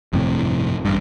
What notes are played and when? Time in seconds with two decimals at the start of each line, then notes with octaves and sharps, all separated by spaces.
0.13 G1 F2 A2 C3
0.85 A1 G2